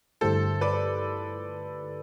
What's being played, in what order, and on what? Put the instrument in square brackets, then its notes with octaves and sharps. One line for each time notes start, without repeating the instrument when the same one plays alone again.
[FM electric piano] G2 D3 A3 E4 G4 [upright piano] A4 C5
[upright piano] B4 D5